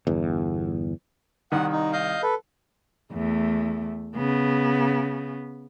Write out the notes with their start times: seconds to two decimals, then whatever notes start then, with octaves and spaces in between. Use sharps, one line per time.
0.07 G1 E2
1.52 C2 D#3 F#5
1.73 D#4
1.93 D#5 F5 G6
2.23 A4 B4
3.12 E2 A3
4.16 C#3 B3